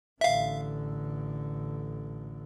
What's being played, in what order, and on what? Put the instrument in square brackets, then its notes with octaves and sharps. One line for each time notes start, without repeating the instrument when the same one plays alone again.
[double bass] A1 D3 [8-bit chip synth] E5 F5